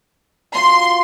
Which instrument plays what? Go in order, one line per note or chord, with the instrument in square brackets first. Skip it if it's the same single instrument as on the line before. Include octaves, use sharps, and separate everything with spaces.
[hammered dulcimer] F4 F#4 [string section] C6